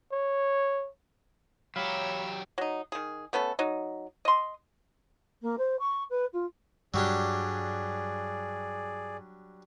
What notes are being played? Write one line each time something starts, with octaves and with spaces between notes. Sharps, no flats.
C#5
F#3 G4 C#5 F5 A#5 B5 E6
F#3 D#4
D#3 G#4
A3 B3 C#4 A4
F#3 D#4
D#5 C6
A#3
C5
C#6
B4
F4
G2 F#3 G3 D4 G#4 D5